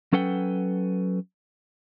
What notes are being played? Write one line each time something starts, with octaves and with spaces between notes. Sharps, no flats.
F#3 C#4 A4 B4 F#5 G5